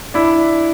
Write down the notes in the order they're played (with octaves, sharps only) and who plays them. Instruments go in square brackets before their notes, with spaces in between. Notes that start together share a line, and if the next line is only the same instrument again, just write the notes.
[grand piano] D4 E4